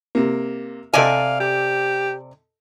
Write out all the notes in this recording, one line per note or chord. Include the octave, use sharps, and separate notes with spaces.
C3 A#3
C3 A4 D5 D#5 F5 G#5
G4